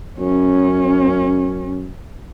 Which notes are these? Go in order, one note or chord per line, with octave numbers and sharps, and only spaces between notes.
F#2 C#4